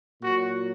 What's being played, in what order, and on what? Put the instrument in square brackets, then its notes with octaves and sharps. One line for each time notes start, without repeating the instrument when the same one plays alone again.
[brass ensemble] A#2 F#3 F#4